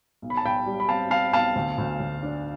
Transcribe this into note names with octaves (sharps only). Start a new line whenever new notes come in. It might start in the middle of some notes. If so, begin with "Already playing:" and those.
B1
B5
A5
B1 G5 B5
G3
B5
C4 F5 A5
C4 F5 A5
B1 F5 A5
D2
D2
D2
D4